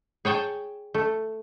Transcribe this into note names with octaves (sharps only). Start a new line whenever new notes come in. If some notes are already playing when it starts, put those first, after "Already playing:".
G#4 C#5 G5 A5
A3